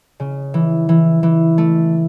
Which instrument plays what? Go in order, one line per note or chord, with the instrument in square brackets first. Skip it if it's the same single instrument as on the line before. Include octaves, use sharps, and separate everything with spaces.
[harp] C#3
E3
E3
E3
A3